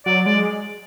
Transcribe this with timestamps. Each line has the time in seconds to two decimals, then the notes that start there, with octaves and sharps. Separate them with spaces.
0.06 F#3 D5
0.25 G#3 D5